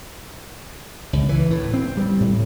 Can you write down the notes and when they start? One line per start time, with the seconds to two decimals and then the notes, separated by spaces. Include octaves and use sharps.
1.13 C#2
1.29 E3
1.51 A2
1.74 C4
1.97 G3
2.20 A2